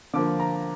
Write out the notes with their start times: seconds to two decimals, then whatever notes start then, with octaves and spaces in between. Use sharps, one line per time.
0.14 D3 F3 A#3 D6
0.40 A#5